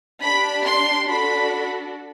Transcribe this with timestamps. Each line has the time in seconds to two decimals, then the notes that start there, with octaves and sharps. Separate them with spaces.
0.22 D4 G4 B5
0.64 C6
1.06 D4 F#4 A4 B5